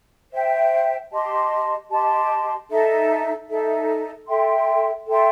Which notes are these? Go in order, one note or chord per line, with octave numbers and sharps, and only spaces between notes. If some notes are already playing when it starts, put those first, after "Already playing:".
C5 E5 G5
G4 D#5 A5 C6
G4 D#5 A5 C6
D#4 A4 E5
D#4 A4 E5
A4 E5 G5 C6
A4 E5 G5 C6